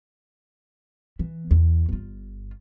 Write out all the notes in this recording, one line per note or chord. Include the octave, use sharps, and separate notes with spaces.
E3
E2
G1 F4